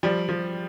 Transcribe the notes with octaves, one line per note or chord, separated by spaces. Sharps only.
F3 G3
F3